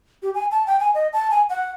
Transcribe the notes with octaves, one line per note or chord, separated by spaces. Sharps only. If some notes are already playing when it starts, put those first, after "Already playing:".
G4
G#5
A5
G5
G#5
D#5
A5
G#5
F#5